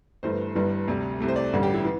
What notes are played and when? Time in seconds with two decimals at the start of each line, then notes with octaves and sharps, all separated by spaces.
0.23 G1 G2 E3 A3 C5
0.55 G1 G2 E3 G3
0.88 D2 C3 G3
1.20 C2 C3 A3
1.28 C5
1.36 D5
1.53 A1 G2 D3 G3
1.63 G4
1.74 E4
1.84 E3